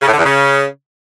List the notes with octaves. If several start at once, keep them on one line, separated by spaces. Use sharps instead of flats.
C#3
A2
D3
E2
C#3